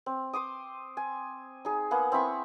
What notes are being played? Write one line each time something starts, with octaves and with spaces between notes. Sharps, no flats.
C4
C5 C6 D6 D#6
G#5
D#4 G#4
A#3 B3 G#4 F#5
C4 E4 B5 C#6